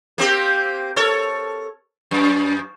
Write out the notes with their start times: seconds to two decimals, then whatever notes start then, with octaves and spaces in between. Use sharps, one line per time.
0.18 A#3 C4 G4
0.96 A4 A#4 C#5
2.11 F#2